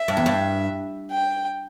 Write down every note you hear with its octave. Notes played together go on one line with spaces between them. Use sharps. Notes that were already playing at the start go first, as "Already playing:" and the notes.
Already playing: E5
G2
E2
G2
G5